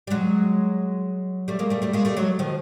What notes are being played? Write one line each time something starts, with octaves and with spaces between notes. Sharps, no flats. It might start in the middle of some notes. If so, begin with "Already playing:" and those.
G3
F#3 G#3
G3 A3
G#3 A#3
G3 A3
G3 A3
G#3 A#3
G3 A3
F#3 G#3
D#3 F3